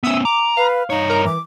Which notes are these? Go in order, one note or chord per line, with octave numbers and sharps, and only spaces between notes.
B3 C#4 E5 D#6 E6
A#5 D6
B4 F5
G2 D#4 C#5
A#4 A#5
E3 D6